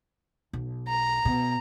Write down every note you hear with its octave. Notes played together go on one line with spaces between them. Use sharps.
B1
A#5
B2